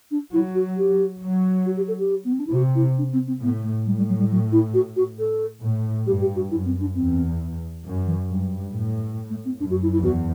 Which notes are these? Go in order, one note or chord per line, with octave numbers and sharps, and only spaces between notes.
D4
F#3 E4
F#4
G4
F#3
F#4
G4
A4
G4
B3
C4
D4
E4
C3 F#4
E4
D4
C4
C4
A2 B3
A3
A2 G3
G3
F#3
G3
F#3
E4
F#4
F#4
A4
A2
G2 G4
G4
F#4
F#2 E4
C4
D4
E2 C4
F#2
E3
G2 F#3
A2
A3
C4
F#2 D4
F#4
E4
E4
E2 F#4